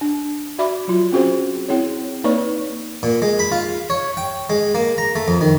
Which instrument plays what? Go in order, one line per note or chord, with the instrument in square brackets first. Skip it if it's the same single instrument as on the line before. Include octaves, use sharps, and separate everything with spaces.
[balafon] D4
F#4 D5 E5 B5 D6
F#3 F4
C4 C#4 F#4 G#4 C5
C4 E4 G#4 C#5
A#3 D#4 B4 C#5 D5 C#6
[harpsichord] A#2
G#3
B5
F4
C#5
G5
G#3
A#3
A#5
A3
F2
D#3